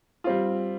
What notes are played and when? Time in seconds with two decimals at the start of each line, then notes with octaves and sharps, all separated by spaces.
0.24 G3 C4 F4